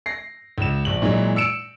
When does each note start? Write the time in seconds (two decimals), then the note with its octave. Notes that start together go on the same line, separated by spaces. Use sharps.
0.06 A#6 C7
0.58 C#2 E7
0.85 A#1 F#7
1.02 A#2 E3 F#3 G#3
1.36 E6 C#7 D7 E7